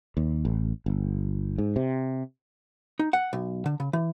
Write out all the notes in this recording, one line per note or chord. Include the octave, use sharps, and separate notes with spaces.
D#2
A1
G1
G#2
C3
D#4
F#5
B1
D3
C#3
E3